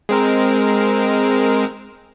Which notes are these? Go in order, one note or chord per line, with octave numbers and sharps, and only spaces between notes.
G#3 C4 A#4